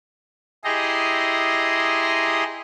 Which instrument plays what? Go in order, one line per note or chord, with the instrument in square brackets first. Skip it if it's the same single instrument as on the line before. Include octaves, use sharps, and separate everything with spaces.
[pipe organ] E4 G4 G#4 D#5 A#5 C6